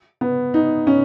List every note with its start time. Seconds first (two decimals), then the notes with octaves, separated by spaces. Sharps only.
0.21 B3
0.54 D#4
0.87 C#4